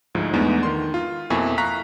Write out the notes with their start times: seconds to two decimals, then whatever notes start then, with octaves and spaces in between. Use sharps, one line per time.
0.15 D2 G#2 F3
0.34 E2 G#3 A3 B3 D4 D#4
0.63 D#3 C6
0.94 F4
1.30 F2 B2 A#3 E4 G#5 C#6
1.58 F5 A#5 C#6 F#6 B6